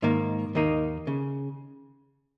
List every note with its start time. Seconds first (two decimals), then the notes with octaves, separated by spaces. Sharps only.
0.02 G#2 D#3 A#3
0.55 D#2 D#3 A#3 D#4
1.07 C#3